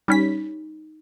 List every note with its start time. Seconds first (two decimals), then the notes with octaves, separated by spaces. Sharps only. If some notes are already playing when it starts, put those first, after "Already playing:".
0.08 G3 C#4 D#4 B6